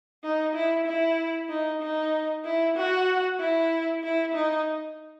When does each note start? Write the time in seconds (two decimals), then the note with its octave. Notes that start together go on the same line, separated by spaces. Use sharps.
0.24 D#4
0.55 E4
0.87 E4
1.49 D#4
1.82 D#4
2.45 E4
2.77 F#4
3.40 E4
4.03 E4
4.35 D#4